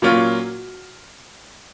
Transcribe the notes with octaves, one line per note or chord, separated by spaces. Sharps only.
A#2 F#3 A#3 C#4 F4 F#4